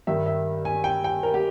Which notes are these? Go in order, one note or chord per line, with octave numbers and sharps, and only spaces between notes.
G2 D#3 G3 E5
E5
G#5
G5
G5
A#4
G4